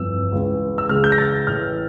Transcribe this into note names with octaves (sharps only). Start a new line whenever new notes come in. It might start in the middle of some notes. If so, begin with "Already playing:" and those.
Already playing: G1 F2 E3 E6
C#2 C#3 E3
E6
C#2 C#3 E3 F6
G6
A#6
A6
A1 A2 E3 F6